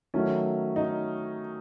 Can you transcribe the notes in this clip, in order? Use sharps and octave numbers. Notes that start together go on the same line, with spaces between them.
D#3 F#3 A3 C#4
D#4